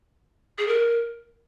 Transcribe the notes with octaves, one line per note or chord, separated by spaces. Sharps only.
G#4
A#4